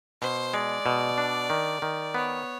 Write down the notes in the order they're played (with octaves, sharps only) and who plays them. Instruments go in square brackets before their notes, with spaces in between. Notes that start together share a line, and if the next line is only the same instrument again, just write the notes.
[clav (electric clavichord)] B2 [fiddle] C5
[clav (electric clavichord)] G#3 [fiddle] D5
[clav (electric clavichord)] B2
D4
D#3
D#3
[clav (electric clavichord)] B3 [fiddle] C#5